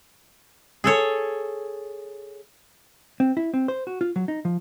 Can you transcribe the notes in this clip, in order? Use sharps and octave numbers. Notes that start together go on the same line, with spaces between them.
G#4 A4 C#5
C4
E4
C4
C5
F#4
F4
F#3
D#4
F3